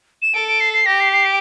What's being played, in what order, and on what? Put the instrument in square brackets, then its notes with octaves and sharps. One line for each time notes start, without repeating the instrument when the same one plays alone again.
[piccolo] E7
[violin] A4 [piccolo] D7
[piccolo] D7
C7
C7
[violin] G4 [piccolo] A#6
[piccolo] C7
C7
D7